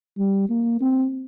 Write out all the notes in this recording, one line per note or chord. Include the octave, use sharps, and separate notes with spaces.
G3
A#3
C4